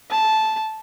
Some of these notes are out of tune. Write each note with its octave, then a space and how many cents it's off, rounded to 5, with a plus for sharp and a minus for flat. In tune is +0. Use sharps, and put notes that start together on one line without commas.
A5 -10